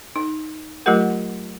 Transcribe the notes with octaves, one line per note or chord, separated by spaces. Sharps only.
D#4
F#3 A3 F4 G4 A#4 F#5